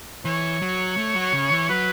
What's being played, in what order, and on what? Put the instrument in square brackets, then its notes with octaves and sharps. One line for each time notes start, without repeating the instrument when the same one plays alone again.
[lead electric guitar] E3 [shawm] C#5
[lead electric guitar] F#3
A3
F#3
C#3
E3
[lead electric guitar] F#3 [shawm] B4